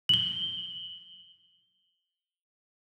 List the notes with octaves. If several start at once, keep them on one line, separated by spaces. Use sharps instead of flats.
F#7 G7